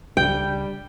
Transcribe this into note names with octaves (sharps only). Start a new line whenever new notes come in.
C#2 C#3 G3 D4 G5